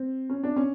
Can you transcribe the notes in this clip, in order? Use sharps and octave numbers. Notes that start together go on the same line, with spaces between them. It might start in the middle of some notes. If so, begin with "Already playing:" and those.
Already playing: C4
C#4
D4
C#4